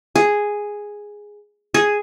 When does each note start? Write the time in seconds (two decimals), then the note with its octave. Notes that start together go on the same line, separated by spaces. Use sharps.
0.16 G#4
1.74 G#4